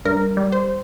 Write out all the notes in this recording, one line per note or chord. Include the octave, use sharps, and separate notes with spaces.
G2 A#4
G3
C5